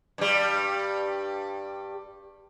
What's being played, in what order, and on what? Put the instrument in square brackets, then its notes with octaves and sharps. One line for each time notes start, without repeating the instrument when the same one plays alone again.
[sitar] G2 G3